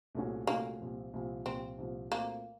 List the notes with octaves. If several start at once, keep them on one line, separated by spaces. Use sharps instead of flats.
C2 A#2 A3 C#4 F#4
C2 A#2 A3 A#3 C#4 F#4
C2 A#2 F3
C2 A#2 F3
C2 A#2 F3 C4
C2 A#2 F3
A#2 A3 A#3 C4 F#4